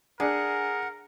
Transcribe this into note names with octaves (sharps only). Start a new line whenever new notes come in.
D4 G#4 A#4 F#5